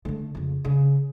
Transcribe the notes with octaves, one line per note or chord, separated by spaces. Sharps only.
D3 A3
F2 C#3
C#3